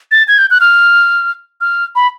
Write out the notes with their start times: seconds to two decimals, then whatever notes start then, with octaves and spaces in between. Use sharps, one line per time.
0.12 A6
0.28 G#6
0.38 G6
0.51 F#6
0.61 F6
1.61 F6
1.95 B5